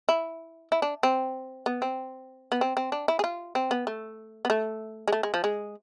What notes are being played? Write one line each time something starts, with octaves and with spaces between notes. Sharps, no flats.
E4
E4
D4
C4
B3
C4
B3
C4
C4
D4
E4
G#4
F4
C4
B3
A3
B3
A3
G#3
A3
G#3
F3
G#3